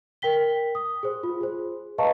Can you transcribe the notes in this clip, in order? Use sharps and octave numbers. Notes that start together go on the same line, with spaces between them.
A#4 G5 B6 G7
D#6
G#4 C5
F4
G#4 C5
B4 D#5 F5 A5 A#5 C#6